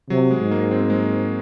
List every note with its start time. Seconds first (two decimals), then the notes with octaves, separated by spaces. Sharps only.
0.10 C3 F#3
0.31 G#3
0.41 G#2
0.51 A#3
0.71 C4
0.80 A#3
0.90 G#3
0.99 A#3